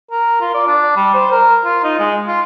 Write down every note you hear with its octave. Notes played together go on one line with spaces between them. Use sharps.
A#4
F4
D5
D4
G3
C5
A#4
F4
D#4
G#3
F4